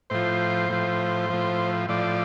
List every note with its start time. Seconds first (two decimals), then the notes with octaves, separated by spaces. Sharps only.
0.10 A2 F3 C5
0.70 A2 F3
1.30 A2 F3
1.89 A2 F3 D5